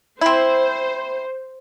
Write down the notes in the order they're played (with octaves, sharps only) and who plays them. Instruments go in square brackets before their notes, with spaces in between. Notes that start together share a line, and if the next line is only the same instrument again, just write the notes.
[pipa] C4 E4 [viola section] C5